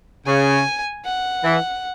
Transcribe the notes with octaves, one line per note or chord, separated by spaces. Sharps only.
C#3 G#5
F#5
E3